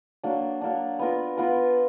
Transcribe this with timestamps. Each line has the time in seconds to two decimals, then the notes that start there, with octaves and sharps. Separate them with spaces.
0.23 F#3 A#3 D4
0.61 F#3 A#3 D4
0.99 B3 F4 A#4
1.37 B3 F4 A#4